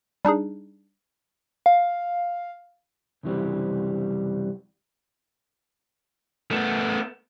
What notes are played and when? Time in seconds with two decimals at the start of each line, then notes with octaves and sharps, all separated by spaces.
0.25 G3 D4 D#4 G#4
1.66 F5
3.23 C2 F#2 C#3 E3 G3 C4
6.51 A3 B3